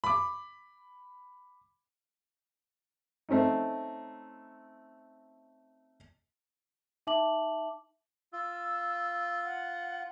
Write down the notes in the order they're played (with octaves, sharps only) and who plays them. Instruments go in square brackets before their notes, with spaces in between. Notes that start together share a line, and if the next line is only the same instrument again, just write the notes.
[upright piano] B5 D6
[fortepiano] A3 C4 C#4 D#4
[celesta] D#4 E5 A5 D6 F#7
[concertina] F4 [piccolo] E6
[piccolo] F#5